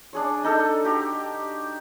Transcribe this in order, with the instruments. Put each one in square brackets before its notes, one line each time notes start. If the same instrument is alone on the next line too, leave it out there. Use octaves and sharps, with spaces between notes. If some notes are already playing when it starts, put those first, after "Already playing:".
[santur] D4 G#4 C#5
D4 D#4 A4
F#4 G4 A#5